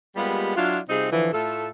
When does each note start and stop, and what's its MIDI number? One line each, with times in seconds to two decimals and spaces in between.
0.16 0.56 55
0.16 0.56 56
0.16 0.56 58
0.16 0.56 59
0.16 0.56 65
0.16 0.56 67
0.56 0.78 54
0.56 0.78 62
0.56 0.78 64
0.56 0.78 65
0.89 1.07 48
0.89 1.07 55
0.89 1.07 60
0.89 1.07 63
0.89 1.07 65
0.89 1.07 68
1.11 1.30 50
1.11 1.30 52
1.11 1.30 53
1.32 1.68 45
1.32 1.68 57
1.32 1.68 65
1.32 1.68 69